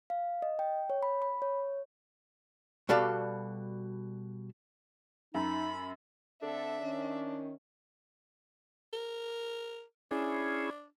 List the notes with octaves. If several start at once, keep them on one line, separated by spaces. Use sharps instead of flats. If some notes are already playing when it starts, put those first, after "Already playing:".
F5
D#5
G5
C#5
B5
B5
C#5
B2 G3 F#4 A4 D5 F5
F#2 D#4 B5
D3 C4 D4 A4 E5
D#3 C#4
A#4
C#4 D4 E4 G#4